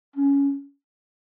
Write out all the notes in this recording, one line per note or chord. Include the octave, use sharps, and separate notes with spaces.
C#4